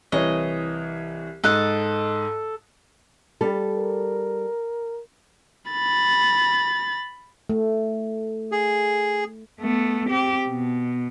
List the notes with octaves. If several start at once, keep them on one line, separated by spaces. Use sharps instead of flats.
C2 E3 C#5 D#5
G#2 A4 D#5 F#6
G3 A4
A#4
B5 A6
A3
G#4
A3 B3
C4 G4
B2